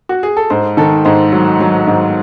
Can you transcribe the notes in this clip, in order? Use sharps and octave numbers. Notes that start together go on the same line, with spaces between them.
F#4
G#4
A4
G#2 C5
D#3 A4
G#2 C5
F#3
F#3
G#2